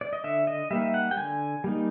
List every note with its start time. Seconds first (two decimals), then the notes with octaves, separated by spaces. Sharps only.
0.01 D5
0.13 D#5
0.24 D3 E5
0.47 D#5
0.71 G3 A#3 D#4 E5
0.94 F#5
1.11 G5
1.17 D3 G#5
1.64 G3 A#3 D#4